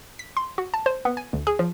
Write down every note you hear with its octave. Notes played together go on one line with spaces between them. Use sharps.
B6
C6
F#4
A5
C5
B3
G#5
D2
G#4
F3